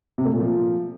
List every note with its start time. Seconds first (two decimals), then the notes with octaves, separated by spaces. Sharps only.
0.18 C3
0.26 A3
0.33 A#2
0.40 F3